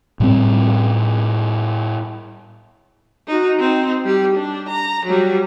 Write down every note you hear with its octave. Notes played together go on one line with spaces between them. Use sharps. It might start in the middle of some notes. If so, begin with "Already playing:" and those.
A2 G3 C4
D#4 F#4
C4 D#4
G3 G4
D4
A#5
F#3 G3